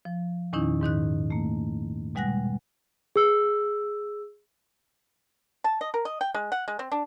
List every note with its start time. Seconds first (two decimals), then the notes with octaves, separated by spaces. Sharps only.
0.05 F3
0.53 E2 A#2 D#3 C#4 D#4 E4
0.81 G#2 D#3 D#4 F#6
1.30 A3 A#3
2.15 B2 G3 G#3 F#5 F#6 A#6
3.16 G#4 E6
5.64 A5
5.81 D#5
5.94 A#4
6.05 D#5
6.21 G5
6.34 G#3
6.52 F#5
6.68 G#3
6.79 C4
6.92 D4